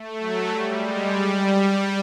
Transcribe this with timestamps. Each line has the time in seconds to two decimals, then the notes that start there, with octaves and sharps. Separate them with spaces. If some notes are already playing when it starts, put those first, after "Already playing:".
Already playing: A3
0.19 F#3
0.49 G3
0.78 G#3
1.08 G3